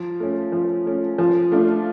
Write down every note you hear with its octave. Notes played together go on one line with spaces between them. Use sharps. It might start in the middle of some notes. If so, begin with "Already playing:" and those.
Already playing: F3
A3 C#4
F3
A3 C#4
F3
A3 D4 F4